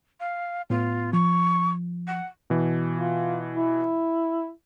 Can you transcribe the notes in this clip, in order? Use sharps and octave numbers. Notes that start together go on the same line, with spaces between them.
F5
A2 B3 F4
F3 C#6
F#5
B2 E3
F4
E4